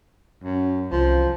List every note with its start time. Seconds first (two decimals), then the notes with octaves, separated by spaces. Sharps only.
0.43 F#2
0.91 C2 E3 F3